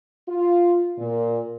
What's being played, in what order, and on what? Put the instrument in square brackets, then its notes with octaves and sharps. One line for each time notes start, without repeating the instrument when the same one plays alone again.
[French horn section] F4
A#2